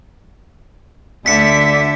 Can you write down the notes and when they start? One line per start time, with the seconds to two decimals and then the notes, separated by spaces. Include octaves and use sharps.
1.26 D2 D3 E5 B6 C#7